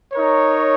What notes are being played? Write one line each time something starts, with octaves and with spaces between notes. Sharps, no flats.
D#4 A#4 C#5